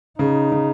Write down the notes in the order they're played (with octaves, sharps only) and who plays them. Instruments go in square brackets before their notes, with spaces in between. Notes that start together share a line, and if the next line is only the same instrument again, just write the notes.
[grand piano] C#3 [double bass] D#4
[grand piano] C#3